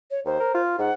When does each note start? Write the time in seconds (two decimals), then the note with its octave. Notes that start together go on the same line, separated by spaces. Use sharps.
0.11 C#5
0.26 D#2 C5
0.40 A#4
0.55 F4
0.79 G#2 F#5